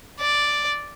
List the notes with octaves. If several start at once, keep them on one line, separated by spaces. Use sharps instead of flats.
D5